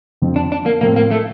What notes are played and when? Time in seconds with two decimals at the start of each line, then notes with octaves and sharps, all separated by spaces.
0.22 F2 D3 F3 C4
0.36 D4
0.52 D4
0.66 A#3
0.81 A2 F3 A#3 C4
0.96 A#3
1.11 A3